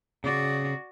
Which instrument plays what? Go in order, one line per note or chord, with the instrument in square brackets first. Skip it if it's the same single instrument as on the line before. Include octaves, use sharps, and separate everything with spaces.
[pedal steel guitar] C#3 [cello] F#4 D5